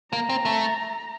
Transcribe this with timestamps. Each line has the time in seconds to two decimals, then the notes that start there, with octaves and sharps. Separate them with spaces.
0.13 A#3 A#5
0.29 C4
0.45 A3